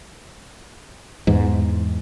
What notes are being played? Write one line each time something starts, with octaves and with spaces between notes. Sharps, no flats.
E2 G#2